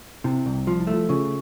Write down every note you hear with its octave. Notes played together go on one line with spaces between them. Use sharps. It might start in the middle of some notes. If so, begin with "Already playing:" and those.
C3 E4
C2
F3 F4
E4
A3
F4
C#3 F4